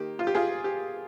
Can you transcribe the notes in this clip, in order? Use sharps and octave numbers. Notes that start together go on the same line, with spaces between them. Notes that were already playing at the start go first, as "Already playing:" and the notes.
Already playing: D#3 A#3 G4
F4
G4
F4 G#4
G4